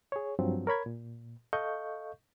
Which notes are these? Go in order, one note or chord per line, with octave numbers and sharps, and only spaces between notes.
G#4 C#5
G2 F3 F#3 C4
A#4 C#5 B5 G#6
A#2
A4 D#5 F5 C#6 G6